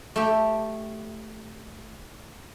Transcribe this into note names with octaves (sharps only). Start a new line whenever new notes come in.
A3 G4